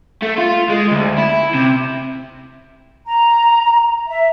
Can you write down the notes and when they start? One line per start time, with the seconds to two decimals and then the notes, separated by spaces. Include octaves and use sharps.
0.22 A3
0.38 F4
0.70 G#3
0.91 D2
1.18 E4
1.55 C3
3.06 A#5
4.08 E5